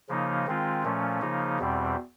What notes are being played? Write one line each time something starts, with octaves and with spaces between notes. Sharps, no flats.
C#3 F3 A#3 D#4
D#3 G#3 C4 F4
A#2 F3 A3 C#4
C#3 F3 A#3 D#4
E2 B2 G3 C4